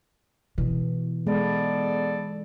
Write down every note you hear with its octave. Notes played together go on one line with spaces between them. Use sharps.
B2 E3
G#3 B3 A4 D5